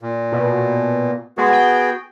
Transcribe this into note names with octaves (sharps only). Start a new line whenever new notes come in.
A#2
B2
G#3 B3 F#4 G#4
G5